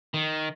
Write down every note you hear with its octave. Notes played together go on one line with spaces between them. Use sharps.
D#3